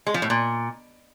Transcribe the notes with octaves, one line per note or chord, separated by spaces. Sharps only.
G#3
F3
A2
A#2